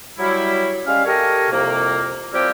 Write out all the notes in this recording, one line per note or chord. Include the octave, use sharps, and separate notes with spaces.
F#3 G3 E4
G3 G#3 C#4 F5
G4 A4 A#4 C#5 D#5 F5
C2 F2 C3 A#3
F3 G3 C4 E4 G4 A#4